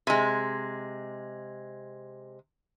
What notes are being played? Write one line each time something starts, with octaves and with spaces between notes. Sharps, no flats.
C3 G#3